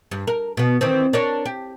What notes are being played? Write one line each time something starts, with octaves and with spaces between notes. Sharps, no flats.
G2
A#4
B2 B3
D#3 E3 C4
D4 A#4 C#5
G4